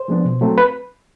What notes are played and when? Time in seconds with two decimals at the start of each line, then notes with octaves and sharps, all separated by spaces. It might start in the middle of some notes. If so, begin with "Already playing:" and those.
Already playing: C5
0.08 F3 G#3 B3 D4
0.25 B2
0.41 F#3 A3 C4
0.58 B4